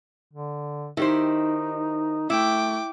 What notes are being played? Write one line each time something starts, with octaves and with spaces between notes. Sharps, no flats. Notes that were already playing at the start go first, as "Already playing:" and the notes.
D3
D#3 D#4 E4 G4 C5
A3 E4 G5 D6